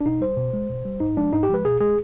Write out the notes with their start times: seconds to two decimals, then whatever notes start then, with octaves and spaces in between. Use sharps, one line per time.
0.01 D4
0.05 B2 D#4
0.21 G3 C5
0.37 B2
0.53 G#3
0.69 B2
0.85 G3
1.00 G#2 D#4
1.17 F3 G#3 D4
1.33 G#2 D#4
1.43 G4
1.49 F3 G#3 B4
1.65 B2 G#4
1.81 G#3 G#4